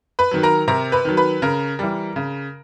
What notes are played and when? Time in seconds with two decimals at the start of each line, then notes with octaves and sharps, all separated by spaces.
0.19 B4 B5
0.31 D#3 F#3
0.43 A#4 A#5
0.68 C3 A#4 A#5
0.92 B4 B5
1.05 D#3 F#3
1.17 B4 B5
1.42 C#3 A#4 A#5
1.79 E3 G3
2.16 C#3